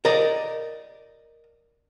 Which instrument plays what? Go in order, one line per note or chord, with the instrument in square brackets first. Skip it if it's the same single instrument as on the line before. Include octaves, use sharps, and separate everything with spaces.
[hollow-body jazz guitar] A#4 D5 D#5